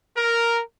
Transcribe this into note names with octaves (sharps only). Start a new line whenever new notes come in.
A#4